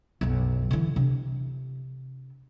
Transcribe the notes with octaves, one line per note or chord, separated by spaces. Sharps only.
B1 F#2
D3 E3
C3 D4